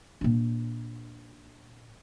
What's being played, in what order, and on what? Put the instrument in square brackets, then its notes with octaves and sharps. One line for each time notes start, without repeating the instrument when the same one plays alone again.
[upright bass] A#2 D4